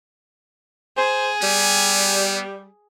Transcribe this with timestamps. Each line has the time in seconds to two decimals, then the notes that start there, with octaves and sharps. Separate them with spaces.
0.97 G#4 C5
1.42 G3 B3